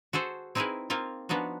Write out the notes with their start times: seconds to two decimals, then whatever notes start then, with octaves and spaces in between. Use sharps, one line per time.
0.13 F#4 G#4 A4 C5
0.55 C4 D#4 E4 G#4 A#4 B4
0.90 A#3 C4 D#4 F4
1.29 F3 B3 D4 D#4 F#4